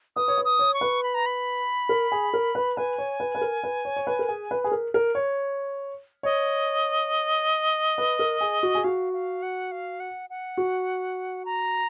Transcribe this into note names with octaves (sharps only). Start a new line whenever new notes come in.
B4 D#6
C#5
B4
D#6
C#5
C#6
B4
B5
A#5
B5
A#4
G#4
A#4
B4
B4 G#5
C#5
B4
B4
A#4
B4
C#5
C#5
B4
A#4
G#4
B4
G#4
A#4
A#4
C#5
C#5 D#5
B4
A#4
G#4
F#4
G#4
F#4 F5
F5
F#5
F5
F#5
F#5
F#4
A#5